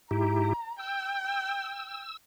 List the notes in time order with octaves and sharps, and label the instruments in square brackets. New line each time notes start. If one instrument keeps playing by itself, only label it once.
[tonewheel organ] G#2 E4 G4 [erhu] A#5
[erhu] G5 [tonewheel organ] E6
[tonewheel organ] E6